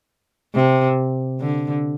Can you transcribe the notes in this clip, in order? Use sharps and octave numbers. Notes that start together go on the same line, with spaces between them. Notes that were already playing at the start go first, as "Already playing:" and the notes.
C3
D3